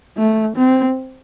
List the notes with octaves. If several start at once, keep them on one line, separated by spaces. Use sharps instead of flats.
A3
C4